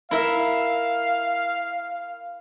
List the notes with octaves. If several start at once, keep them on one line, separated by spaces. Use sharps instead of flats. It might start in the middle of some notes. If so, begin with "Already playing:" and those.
E4 A#4 E5 F5